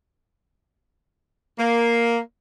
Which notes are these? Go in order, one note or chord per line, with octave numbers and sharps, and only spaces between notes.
A#3